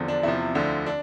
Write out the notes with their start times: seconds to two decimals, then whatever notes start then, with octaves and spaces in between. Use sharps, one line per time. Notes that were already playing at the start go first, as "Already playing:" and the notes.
Already playing: E2 D3 F3
0.08 D4
0.23 E2 C3 F3 E4
0.55 D2 D3 F3
0.86 D4